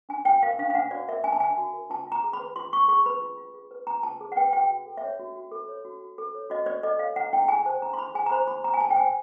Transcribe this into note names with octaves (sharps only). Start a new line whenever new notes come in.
D4 G#5
F#4 G5
A#4 F5
D4 F5
F5
D4 F#5
F#4 D5
A#4 E5
D4 G#5
A5
D4 G#5
F#4
A#4
F4 A5
F4 A#5
G#4
B5
B4
F4 C6
F4 C#6
G#4 C#6
B4 B5
F4
F4
G#4
B4
F4 A#5
F4 A5
G#4
F#5
B4 G5
F#4 G5
F#4
A4
E5
C#5
F#4
F#4
A4
C#5
F#4
F#4
A4
C#5
F#4 D#5
F#4 D5
A4 D#5
C#5 F5
E4 F#5
E4 G5
G#4 G#5
C5 A5
E4 A#5
C6
E4 B5
G#4 G#5
A#5
C5 B5
E4 B5
E4 A#5
G#5
G#4 A5
G5
C5 G#5